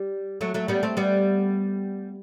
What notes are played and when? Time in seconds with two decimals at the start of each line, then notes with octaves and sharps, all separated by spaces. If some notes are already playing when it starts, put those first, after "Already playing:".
Already playing: G3
0.41 F#3 A3
0.54 F#3 A3
0.68 G3 B3
0.83 A3 C4
0.97 G3 B3